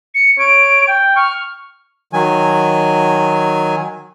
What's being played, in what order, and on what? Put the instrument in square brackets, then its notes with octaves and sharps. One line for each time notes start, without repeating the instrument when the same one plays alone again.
[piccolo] C#7
[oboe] C#5 [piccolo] D7
[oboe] G5
[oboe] C#6 [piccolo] F6
[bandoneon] D#3 F#3 G#5